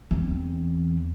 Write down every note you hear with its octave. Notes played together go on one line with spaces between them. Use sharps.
E2 C4